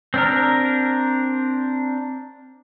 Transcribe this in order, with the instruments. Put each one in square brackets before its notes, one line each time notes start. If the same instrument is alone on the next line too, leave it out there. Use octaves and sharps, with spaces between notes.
[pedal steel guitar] C4 D4 A#4